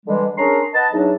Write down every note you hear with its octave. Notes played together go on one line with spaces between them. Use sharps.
D3 E3 G3 G#3
C#4 D4 G#4 A#4 A#5 C6
B4 D#5 F#5 A5
E2 F#3 D4 D#4